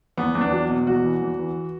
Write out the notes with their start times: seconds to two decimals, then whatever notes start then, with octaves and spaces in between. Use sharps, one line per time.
0.17 E2 B3
0.35 E2
0.41 D4
0.52 F#3
0.69 B2
0.87 E2 F#4
1.04 E3
1.22 E2
1.39 E3